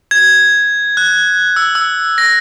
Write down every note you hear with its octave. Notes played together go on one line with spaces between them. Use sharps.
G#6
F#6
E6
E6
A#6